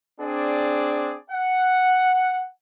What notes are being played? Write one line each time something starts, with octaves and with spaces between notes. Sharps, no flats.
C4 D4 G#4 D5
F#5